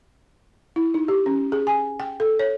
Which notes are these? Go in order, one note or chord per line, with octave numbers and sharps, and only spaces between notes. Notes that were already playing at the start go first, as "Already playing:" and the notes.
E4
D#4
G4
C#4
G#4
G#5
G5
A4
C#5